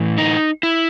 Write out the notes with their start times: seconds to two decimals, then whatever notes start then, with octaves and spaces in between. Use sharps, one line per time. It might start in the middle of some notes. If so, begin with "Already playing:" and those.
Already playing: A2 E3
0.18 D#4
0.63 E4